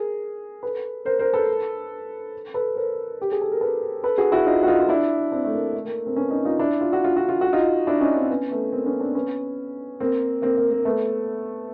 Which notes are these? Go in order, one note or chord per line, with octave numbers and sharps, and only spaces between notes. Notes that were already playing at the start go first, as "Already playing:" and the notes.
Already playing: G#4 A#4
A4 B4
A#4 C5
A#4 C5
A4 B4
A4 B4
A#4 C5
G4
G#4
A4
A#4
A4 B4
A4 B4
F#4 G#4
E4 F#4
D#4 F4
F#4
D#4 F4
F4
D4 E4
C4 D4
A3
A#3
A3
A#3
A#3 C4
B3 C#4
C#4 D#4
D#4 F4
D4 E4
F4
F#4
F4
F#4
F4
F#4
D#4 F4
D4 E4
C#4 D#4
C4 D4
B3 C#4
A3 B3
A#3 C4
B3 C#4
C4 D4
B3 C#4
A#3 C4
A#3 C4
A#3
A#3
A3 B3